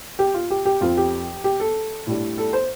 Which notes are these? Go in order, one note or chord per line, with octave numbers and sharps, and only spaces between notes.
G4
F4
G4
G4
F2 F3 C4 F4
G4
G4
A4
A2 G3 D4
A4
C5